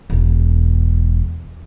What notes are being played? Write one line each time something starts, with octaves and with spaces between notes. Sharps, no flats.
E1 E2